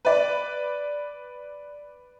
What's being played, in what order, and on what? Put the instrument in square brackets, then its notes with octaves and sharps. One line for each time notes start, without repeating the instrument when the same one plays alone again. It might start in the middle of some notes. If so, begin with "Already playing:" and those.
[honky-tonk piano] B4 D5